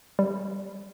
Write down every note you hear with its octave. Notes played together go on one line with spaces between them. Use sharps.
G3